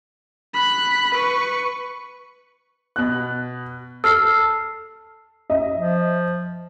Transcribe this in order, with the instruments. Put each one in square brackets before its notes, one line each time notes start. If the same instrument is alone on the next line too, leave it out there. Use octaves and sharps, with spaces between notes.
[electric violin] B5 F#6
B4 C#6
[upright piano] B2 F#6
[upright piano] A4 [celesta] E6 F6 C7
[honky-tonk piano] D#5 E5
[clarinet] F3